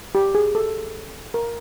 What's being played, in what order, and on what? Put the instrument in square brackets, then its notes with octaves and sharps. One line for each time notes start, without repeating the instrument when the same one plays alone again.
[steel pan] G4
G#4
A4
A#4